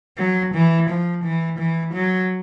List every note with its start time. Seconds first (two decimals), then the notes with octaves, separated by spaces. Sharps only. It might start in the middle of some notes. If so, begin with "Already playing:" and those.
0.18 F#3
0.54 E3
0.89 F3
1.24 E3
1.59 E3
1.94 F#3